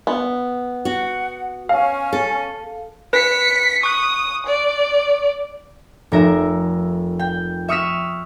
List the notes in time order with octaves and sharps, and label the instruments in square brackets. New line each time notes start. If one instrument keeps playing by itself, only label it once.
[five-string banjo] B3
[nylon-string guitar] F#4 [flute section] F#5
[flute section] C#4 G#5 [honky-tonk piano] F5
[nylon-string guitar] A4
[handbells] B4 [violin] B6 C#7
[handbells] C#6 F#6 [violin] D#6
[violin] D5
[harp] F1 A#4 E5
G5
E5 C#6 D#6 F6 B6 E7